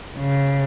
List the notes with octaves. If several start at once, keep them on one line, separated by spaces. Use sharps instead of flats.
C#3